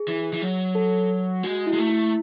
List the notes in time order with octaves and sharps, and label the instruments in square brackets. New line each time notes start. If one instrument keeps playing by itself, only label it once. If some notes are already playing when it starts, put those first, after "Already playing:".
Already playing: [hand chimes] G#4
[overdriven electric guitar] E3
E3
F#3
[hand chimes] A4
[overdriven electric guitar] G#3 [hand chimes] F#4
[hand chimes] E4
[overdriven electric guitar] G#3
A3
[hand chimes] E4